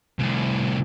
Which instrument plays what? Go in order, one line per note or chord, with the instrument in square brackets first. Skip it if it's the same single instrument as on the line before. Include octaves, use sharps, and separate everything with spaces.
[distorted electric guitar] C2 A2